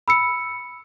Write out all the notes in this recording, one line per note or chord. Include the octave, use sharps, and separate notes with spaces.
B5 E6 C#7